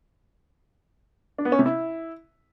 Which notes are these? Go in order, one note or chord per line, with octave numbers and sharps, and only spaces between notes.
D4
B3
C#4
C3
E4